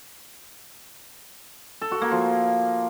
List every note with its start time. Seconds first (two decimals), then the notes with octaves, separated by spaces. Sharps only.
1.82 A4
1.92 F#4
2.02 A#3
2.11 F3